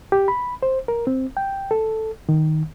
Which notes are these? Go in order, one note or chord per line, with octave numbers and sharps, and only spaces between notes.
G4
B5
C5
A#4
C4
G5
A4
D#3